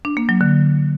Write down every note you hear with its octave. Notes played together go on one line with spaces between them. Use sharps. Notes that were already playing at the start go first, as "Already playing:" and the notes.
D4
A#3
F#3
D3